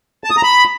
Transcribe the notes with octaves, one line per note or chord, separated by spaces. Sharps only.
A5
D#6
A#5
B5